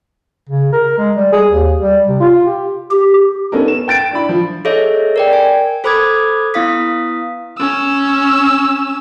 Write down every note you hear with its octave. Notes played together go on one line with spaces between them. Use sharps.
C#3
A#4
G#3
G3
G#4
D#2
G3
C3
F4
G4
G4
B3 C#4 D#4 A4 A#4
E7
G5 A6 D7
D4 E4 B5
F3
G#4 A4 C#5 D#5 E5
A#4 D5 G5
A#4 G#5
A4 C5 B5 D6 D#6 G#6
B3 E4 F5 D#6 B6
C#4 E6